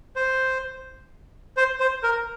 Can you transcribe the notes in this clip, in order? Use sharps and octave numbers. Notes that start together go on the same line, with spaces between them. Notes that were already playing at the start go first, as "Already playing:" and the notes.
C5
C5
C5
A#4